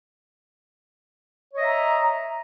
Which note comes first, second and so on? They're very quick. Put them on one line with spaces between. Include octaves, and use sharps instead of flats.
C#5 D#5 E5 A#5